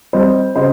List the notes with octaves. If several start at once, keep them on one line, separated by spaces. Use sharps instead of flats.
G3 C4 C5 D#5
C#3 C5 D#5